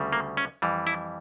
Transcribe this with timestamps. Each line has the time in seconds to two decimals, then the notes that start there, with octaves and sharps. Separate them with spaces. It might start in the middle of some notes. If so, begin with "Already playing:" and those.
Already playing: D2 C#3 G3
0.13 A#3
0.37 C#4
0.62 F2 E3 G3
0.87 E4